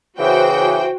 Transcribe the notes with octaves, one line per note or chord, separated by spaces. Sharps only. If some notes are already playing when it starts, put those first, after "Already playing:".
C#3 E3 F#4 C5 G5